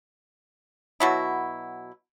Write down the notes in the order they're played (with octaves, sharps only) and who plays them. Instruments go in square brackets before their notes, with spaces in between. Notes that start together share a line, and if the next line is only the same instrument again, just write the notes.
[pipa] B2 F#3 E4